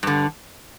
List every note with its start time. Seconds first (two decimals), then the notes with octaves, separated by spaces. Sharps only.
0.03 G2 D3